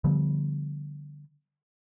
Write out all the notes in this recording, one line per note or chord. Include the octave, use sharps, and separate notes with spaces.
D3 F3 G3 B3